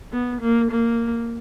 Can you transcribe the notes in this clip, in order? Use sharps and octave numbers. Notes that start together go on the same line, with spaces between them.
B3
A#3
A#3